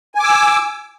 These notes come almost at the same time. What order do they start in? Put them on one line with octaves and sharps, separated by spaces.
G#5 D6 E6